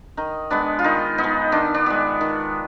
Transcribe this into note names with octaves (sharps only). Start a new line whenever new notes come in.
D#3 D#4
G#3 B3 D4
F4
D#3 D#4
B3 D#4
G#3
D#3 D4
D4
G#3 B3
D#3